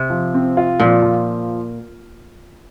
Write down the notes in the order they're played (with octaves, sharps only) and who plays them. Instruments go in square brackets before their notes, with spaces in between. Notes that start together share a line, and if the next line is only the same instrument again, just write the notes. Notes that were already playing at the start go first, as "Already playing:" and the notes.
Already playing: [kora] C3
[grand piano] F3
C4
F4
[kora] A#2 [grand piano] F3
[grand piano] F3